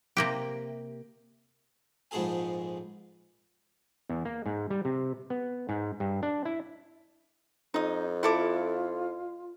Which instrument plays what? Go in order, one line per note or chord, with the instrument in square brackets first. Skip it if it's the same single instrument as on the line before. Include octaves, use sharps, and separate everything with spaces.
[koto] C3 A#3 G4
[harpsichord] A#1 G#2 B3 G#4 A4 G#5
[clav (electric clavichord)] E2
A#3
G#2
G3
C3
B3
G#2
G2
D4
E4
[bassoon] F2 [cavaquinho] D#4 D#6
[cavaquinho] E4 A4 D6 [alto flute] F4